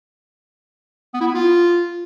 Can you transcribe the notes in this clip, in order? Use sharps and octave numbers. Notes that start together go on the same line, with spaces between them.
B3
E4
B3
F4